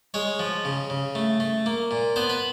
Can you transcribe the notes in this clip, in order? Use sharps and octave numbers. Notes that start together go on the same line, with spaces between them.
G#3 C#5
F3
C#3
C#3
A3
A3
A#3
A#2
B3 C5
B4